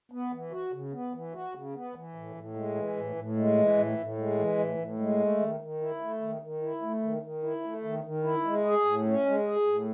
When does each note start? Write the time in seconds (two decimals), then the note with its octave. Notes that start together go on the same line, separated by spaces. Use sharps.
0.12 B3
0.32 E3
0.52 F#4
0.72 C#3
0.93 B3
1.13 E3
1.34 F#4
1.54 C#3
1.74 B3
1.95 E3
2.15 A2
2.35 A2
2.56 G#3
2.75 E3
2.96 A2
3.16 A2
3.37 G#3
3.57 E3
3.78 A2
3.98 A2
4.18 G#3
4.39 E3
4.58 A2
4.78 A2
4.99 G#3
5.20 A3
5.40 D#3
5.60 D#3
5.81 E4
6.01 A3
6.21 D#3
6.42 D#3
6.62 E4
6.82 A3
7.03 D#3
7.22 D#3
7.43 E4
7.64 A3
7.84 D#3
8.04 D#3
8.24 E4
8.45 G#3
8.65 G#4
8.85 A2
9.05 C#4
9.26 G#3
9.47 G#4
9.67 A2